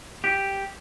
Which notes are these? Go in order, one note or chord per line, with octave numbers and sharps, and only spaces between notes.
G4